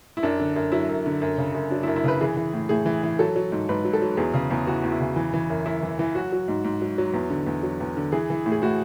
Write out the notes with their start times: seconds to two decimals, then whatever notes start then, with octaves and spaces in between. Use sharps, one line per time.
0.17 E4
0.23 F#2 D4
0.40 D3
0.56 F#2
0.72 F#3 E4
0.89 F#2
1.06 D3
1.22 F#2
1.38 C#3
1.55 F#2
1.70 F#3 D4
1.83 E4
1.88 F#2
1.96 E4
2.04 C#3 B4
2.21 E3 G#4
2.37 E3
2.53 A2
2.69 A2 G#4
2.86 E3
3.03 E3
3.19 F#3 A4
3.36 F#3
3.52 G#2
3.69 G#2 B4
3.85 F#3
3.93 A4
4.02 F#3
4.17 E2 G#4
4.34 C#3
4.51 E2
4.67 E3 F#4
4.84 E2
4.92 E4
5.00 C#3
5.16 E3
5.34 E3
5.50 F#2
5.65 F#2 E4
5.83 E3
5.99 E3
6.15 F#3 F#4
6.32 F#3
6.48 G#2
6.64 G#2
6.82 F#3
6.98 F#3
7.14 E2
7.30 D3
7.47 E2
7.63 F#3
7.80 E2
7.97 D3
8.12 E3 G#4
8.30 E3
8.46 A2
8.52 G#4
8.62 A2 F#4